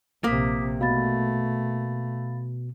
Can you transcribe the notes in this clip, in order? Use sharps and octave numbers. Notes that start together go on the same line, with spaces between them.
A#1 C3 A#3 D6 D#6 B6
B2 A3 F5 B5 A6